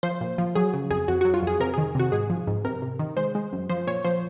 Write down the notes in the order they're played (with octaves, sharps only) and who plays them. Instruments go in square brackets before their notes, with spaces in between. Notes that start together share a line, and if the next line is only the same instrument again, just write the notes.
[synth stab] F3 C5
A#2
F3
F#3 G#4
C#3
F2 G#4
F2 F#4
F#3 F#4
F4
F2 G#4
C3 A#4
D#3 G#4
C3 F#4
G#2 G#4
F3
G#2
C3 A#4
C3
D#3
G#3 C5
G#3
F#2
F3 C5
A#2 C#5
F3 C5